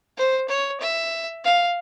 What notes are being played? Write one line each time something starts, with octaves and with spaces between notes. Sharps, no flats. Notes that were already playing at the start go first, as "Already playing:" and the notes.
C5
C#5
E5
F5